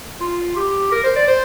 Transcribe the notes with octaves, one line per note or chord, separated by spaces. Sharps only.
F4
G4
A#4
C5
D5
C5